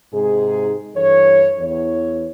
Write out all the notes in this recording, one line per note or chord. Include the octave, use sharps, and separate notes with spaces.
G#2 C3 D#4 G#4
G2 E3 A4 C#5
E2 E3 C#5